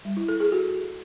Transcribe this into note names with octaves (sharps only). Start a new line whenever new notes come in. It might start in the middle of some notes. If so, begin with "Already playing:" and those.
G3
E4
A4
G#4
F#4